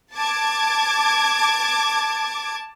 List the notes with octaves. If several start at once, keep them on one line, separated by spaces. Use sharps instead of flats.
A5 D6 G#6